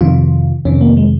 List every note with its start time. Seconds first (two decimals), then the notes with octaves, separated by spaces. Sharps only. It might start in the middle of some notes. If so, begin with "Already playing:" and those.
0.01 F2 C3 D#3 F4
0.65 F2 C3 D#3 C#4
0.81 A#3
0.97 G#3